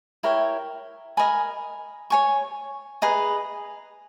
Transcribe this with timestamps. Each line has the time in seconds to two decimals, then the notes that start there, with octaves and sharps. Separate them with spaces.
0.23 E4 A#4 C#5 G5
1.17 A#4 D#5 G#5 B5
2.10 C#5 G#5 C#6
3.02 G#4 B4 D#5 A#5